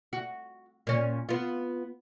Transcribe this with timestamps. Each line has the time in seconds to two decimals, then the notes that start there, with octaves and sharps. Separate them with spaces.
0.13 F#4
0.87 A#2 C#4
1.29 B3 F4